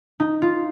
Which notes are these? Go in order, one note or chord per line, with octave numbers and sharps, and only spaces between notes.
D#4
F4